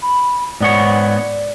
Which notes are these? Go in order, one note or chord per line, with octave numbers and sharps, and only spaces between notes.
B5
G#2 B3 C#5 D5